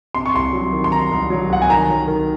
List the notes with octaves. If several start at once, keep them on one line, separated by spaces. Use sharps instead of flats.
C3 C6
C#6
C2 C6
F#3
D#3
C6
D#3 A#5
C2
F#3
C2 F#5
G#5
D#3 A#5
F#3
D#3